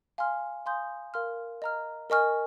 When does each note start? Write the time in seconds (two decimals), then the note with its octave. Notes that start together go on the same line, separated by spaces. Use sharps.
0.18 F5 G#5 C6 F6
0.66 F5 G#5 C6 D#6 G6
1.14 A#4 F5 C6 F6
1.62 D#5 A#5 F6
2.10 A#4 D#5 G#5 C#6 F6